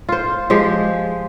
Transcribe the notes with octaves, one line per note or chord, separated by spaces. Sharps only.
F4 C5
F3 G#3 G4